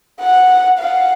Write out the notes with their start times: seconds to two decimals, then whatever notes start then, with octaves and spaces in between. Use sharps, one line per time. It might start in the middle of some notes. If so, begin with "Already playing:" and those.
0.20 F#5
0.78 F5 F#5